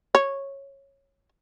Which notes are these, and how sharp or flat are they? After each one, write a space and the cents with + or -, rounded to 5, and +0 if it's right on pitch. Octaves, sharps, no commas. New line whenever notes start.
C#5 -10